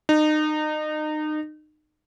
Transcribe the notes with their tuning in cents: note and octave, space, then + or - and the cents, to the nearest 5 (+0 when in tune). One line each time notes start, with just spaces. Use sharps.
D#4 -30